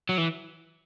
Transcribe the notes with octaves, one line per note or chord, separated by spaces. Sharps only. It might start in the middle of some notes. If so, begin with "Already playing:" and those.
F#3
E3